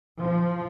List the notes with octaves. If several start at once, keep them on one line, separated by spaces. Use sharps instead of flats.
F3